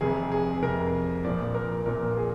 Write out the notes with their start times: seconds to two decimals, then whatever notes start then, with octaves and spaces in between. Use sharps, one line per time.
0.01 F1 F2 C3 G#4
0.32 G#4
0.62 F1 F2 C3 A#4
1.25 A#1 A#2 F3 D5
1.55 A#4
1.86 A#1 A#2 F3 A#4
2.17 G#4